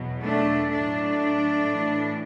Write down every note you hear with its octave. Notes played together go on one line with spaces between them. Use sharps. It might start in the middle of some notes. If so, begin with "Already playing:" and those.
Already playing: E2 B2 F#3
A3 D4
A2 F#3 A3 D4
A2 E3